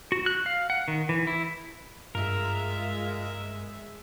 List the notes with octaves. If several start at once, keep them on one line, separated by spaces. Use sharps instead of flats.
F#4
F#6
F5
F#5
D#3
E3
E4
G2 G#3 F4 A#4 E5